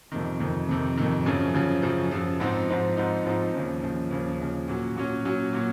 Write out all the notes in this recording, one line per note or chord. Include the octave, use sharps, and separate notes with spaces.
F2 C3 D#3
F2 C3 D#3
F2 C3 D#3
F2 C3 D#3
F#2 C#3 F3
F#2 C#3 F3
F#2 C#3 F3
F#2 C#3 F3
G#2 F3 C4 D#4
G#2 F3 C4 D#4
G#2 F3 C4 D#4
G#2 F3 C4 D#4
D#2 C#3 F3
D#2 C#3 F3
D#2 C#3 F3
D#2 C#3 F3
A#2 F#3 C#4 F#4
A#2 F#3 C#4 F#4
A#2 F#3 C#4 F#4
A#2 F#3 C#4 F#4